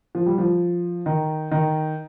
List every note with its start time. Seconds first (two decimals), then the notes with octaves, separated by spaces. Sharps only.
0.15 F3
0.26 G3
0.38 F3
1.06 D#3
1.52 D#3